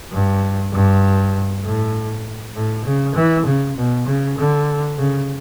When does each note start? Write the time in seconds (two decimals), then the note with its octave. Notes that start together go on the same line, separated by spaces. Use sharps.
0.13 G2
0.73 G2
1.64 A2
2.56 A2
2.85 C#3
3.16 E3
3.46 C#3
3.77 B2
4.06 C#3
4.38 D3
4.98 C#3